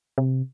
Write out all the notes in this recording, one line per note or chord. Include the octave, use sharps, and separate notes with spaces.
C3